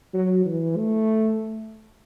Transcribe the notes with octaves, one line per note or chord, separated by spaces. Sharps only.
F#3
E3
A3